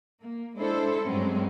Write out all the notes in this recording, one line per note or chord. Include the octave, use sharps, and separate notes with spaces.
A#3
G#3 D4 E4 A4 C5
G2 F#3 G#3 C4 C#4